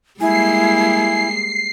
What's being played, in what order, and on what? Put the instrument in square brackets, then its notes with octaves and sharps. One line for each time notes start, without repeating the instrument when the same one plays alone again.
[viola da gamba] G3 G#3 A#3 [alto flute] E4 [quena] G#5 [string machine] C7